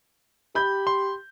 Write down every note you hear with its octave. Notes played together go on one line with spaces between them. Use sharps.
G4 B5 G6
C6